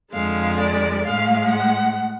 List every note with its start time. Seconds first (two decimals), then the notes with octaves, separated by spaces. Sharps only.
0.14 F2 D3 G#3 F5
0.59 D5
1.05 A2 G#3 F5
1.51 F#5